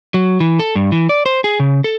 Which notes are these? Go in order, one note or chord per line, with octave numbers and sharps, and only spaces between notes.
F#3
E3
A4
G2
E3
D5
C5
G#4
C#3
A4